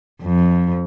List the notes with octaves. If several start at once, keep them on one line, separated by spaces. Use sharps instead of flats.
F2